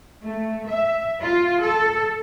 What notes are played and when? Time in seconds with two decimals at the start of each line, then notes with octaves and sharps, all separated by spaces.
0.23 A3
0.67 E5
1.21 F4
1.61 A4